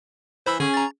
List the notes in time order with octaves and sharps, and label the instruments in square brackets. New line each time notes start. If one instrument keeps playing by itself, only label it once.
[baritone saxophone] E3 [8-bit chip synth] C5 B5 E6
[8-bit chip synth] D3 [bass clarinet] C#4 [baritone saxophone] G#4
[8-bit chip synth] A#5 A6